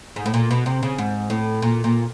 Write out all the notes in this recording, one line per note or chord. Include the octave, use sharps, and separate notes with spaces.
G#2
A2
A#2
B2
C3
C#3
G#2
A2
A#2
A#2